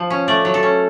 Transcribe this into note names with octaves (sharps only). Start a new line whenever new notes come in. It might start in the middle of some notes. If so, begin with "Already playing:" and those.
Already playing: F3
C#4
A3 D5
F#3
A4
C#4